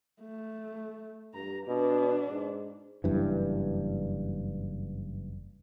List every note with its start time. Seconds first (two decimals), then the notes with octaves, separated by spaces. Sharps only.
0.22 A3
1.35 G2 A#5
1.67 B2 D4
2.29 G#2
3.04 F#1 G2 E3